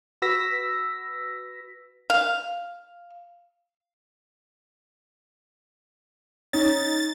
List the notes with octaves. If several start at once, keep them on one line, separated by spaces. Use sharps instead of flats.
F#4 B4 E6 A#6 B6
F5
C#4 D#4 A6